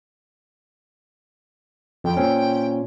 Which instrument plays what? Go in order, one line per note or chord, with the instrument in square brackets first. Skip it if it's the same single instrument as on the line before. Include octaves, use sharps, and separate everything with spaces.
[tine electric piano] F2 [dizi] G5
[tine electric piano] A#2 C4 C#4